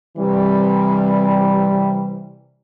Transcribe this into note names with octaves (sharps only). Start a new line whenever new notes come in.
C3 E3 G3